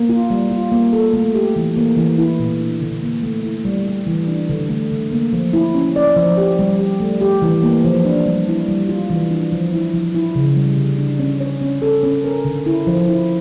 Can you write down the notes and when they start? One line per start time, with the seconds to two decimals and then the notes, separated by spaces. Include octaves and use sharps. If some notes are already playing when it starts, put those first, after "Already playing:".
Already playing: A#3
0.09 F4
0.30 G3
0.51 F4
0.72 A#3
0.93 A4
1.13 A3
1.34 G4
1.56 E3
1.77 A#3
1.97 E3
2.18 E4
2.39 A#2
2.60 D4
2.81 D3
3.02 A#3
3.23 A3
3.44 E4
3.65 G3
3.86 G4
4.07 E3
4.28 D4
4.49 D3
4.70 A3
4.91 D3
5.12 A#3
5.33 F3
5.53 E4
5.75 C#4
5.96 D5
6.16 F3
6.37 G4
6.59 G3
6.79 G4
7.00 A3
7.21 G4
7.42 E3
7.63 A#3
7.84 F3
8.05 D4
8.26 G3
8.48 E4
8.68 G3
8.89 F4
9.10 E3
9.30 D4
9.52 F3
9.73 E4
9.94 F3
10.15 E4
10.35 C#3
10.56 G3
10.77 D3
10.98 D4
11.19 C#4
11.40 C#5
11.61 C#4
11.82 A4
12.03 C#4
12.24 A#4
12.45 D3
12.66 E4
12.87 F3
13.08 E4